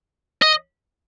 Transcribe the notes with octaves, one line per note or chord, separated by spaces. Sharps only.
D#5